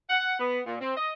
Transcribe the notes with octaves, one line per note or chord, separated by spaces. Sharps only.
F#5
B3
A#2
C4
D#5